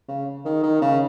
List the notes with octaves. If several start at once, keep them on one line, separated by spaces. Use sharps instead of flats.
C#3
D#3
D#3
C#3